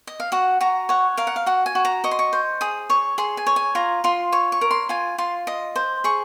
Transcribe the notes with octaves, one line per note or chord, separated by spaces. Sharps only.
D#5
F5
F#4 F#5
F#4 A#5
C#5 F#5
A#4 F5
F#5
F5
F#4 F#5
G#5
F#4
A#5
D#5 C#6
C6
C#6
C5
G#4 D#6
C#5 C#6
G#4 C6
G#5
C#5
G#5
F4 A#5
F4 C6
C#5 C#6
C#6
A#4
C6
F4 G#5
F4 C6
D#5
C5
G#4 C#6